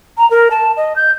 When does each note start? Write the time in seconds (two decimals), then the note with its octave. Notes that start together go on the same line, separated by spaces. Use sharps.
0.18 A#5
0.31 A#4
0.51 A5
0.77 D#5
0.96 G6